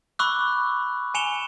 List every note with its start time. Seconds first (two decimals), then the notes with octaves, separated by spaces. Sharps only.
0.19 B5 C#6 D6 E6 F#6
1.14 G#5 C#7 E7 F7 G7